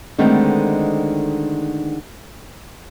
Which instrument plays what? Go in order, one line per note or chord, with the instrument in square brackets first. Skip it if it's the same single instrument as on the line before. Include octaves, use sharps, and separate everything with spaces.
[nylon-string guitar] D3 D#3 G#3 A3 B3 C4